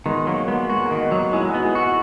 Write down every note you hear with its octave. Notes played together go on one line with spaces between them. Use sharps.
D#3 G#3 B3
F#3 A#3
G#3 B3
G#3 F#4
A#3
D#3
B3 D#4
F#3
G#3 E4 G#4
D#4 F#4
B3
E4 G#4
E4 F#4 G#4